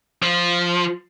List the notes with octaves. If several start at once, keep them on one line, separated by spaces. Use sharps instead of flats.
F3